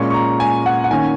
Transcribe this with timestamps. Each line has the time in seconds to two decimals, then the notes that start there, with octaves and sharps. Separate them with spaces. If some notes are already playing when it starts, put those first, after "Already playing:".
Already playing: A#2 G#3 C#4 C#6
0.10 C#6
0.14 A#5
0.40 G#5
0.66 F#5
0.84 F#5
0.91 D#3 A#3 C#4 G#5